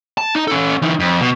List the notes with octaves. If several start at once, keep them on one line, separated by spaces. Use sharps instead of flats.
A5
D#4
C#4 A4
E3 D#4
F2
B2